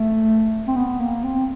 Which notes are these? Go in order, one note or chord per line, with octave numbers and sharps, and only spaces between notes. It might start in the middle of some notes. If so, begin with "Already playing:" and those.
Already playing: A3
C4
B3
A#3
C4